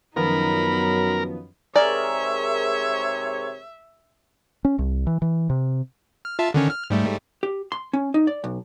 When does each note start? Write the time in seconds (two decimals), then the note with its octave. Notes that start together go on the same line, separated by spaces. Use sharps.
0.16 F#2 D#3 F3 F#3 B3 D#4 A#4 B5
1.76 G#2 C3 G#4 A#4 C#5 D5 E5
4.65 C#4
4.79 C2
5.07 E3
5.22 E3
5.50 C3
6.25 F6
6.39 F4 E5 A5
6.54 D3 D#3 C#4
6.70 F6
6.90 G#2 G3 A3
7.43 G4
7.72 C6
7.93 C#4
8.14 D#4
8.27 D5
8.44 B1